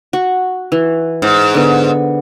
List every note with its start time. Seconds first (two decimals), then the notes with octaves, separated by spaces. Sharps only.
0.13 F#4
0.72 E3
1.22 G#2
1.54 D3 B3